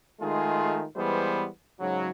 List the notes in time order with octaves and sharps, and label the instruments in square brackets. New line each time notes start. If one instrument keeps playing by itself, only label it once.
[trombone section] D#3 G#3 A3 F4 G#4
E3 G3 G#3 B3 C5
G#2 C#3 F#3